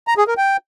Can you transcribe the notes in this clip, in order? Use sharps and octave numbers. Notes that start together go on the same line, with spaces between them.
A#5
G#4
A#4
G5